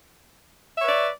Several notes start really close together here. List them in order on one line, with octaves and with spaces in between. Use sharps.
E5 C#5 B4 D5